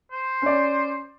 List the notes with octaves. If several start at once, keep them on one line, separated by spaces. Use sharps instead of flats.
C5
C#4 D5